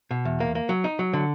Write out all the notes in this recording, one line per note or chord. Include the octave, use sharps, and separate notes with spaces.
B2
E2
A#3
A#3
F#3
D#4
F#3
D3